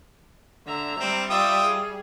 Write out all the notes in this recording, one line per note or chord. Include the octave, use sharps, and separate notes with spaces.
D3 E5 A#5
G3 C4
F4 D5 E5 G5 D#6
G#4